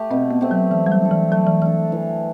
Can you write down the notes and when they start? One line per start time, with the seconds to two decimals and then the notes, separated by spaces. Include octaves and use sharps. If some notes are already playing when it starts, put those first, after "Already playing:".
Already playing: A3 G4
0.11 B2 C4
0.31 B3
0.41 A3 C4 G4
0.51 F#3
0.71 E3 A3
0.86 G3
0.91 F#3
1.02 D4 A4
1.11 E3
1.32 F#3 A3
1.47 E3
1.61 E3 D4 A4
1.92 E3